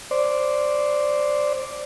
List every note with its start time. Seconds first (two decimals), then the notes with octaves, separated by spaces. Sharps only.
0.11 C5 D5